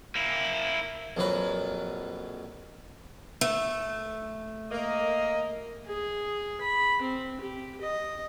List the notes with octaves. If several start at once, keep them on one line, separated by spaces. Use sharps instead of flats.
A#3 E4
A#1 F2 F#3 B4
A3
A#3 D#5
G#4
B5
C4
G4
D#5